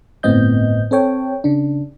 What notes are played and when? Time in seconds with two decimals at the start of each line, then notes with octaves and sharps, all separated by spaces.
0.23 G1 A2 B3 C4 D#5 G6
0.91 C4 A4 C#5 G5
1.44 C#3 D4